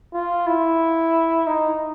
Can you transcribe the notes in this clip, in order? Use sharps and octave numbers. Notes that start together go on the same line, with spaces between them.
F4
E4
D#4